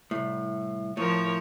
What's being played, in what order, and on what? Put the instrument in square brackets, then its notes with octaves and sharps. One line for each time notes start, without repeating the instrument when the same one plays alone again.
[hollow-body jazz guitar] C2 A2
[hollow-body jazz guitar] A2 [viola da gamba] F3 A#4 C#5